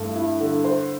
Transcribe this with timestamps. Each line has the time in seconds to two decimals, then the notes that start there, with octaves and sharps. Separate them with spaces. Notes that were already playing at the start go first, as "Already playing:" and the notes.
Already playing: G2 A3 E4
0.16 E4
0.40 D3
0.64 C5